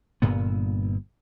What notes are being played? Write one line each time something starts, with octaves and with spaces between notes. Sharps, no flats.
G1 G2 A#2 B3